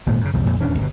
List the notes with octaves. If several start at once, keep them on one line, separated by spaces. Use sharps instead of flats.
G#1 A#2 G#3
F#2 C#3
B1 E2 G3
F2 A#2
D#1 E2 C#4 D4
G1 B2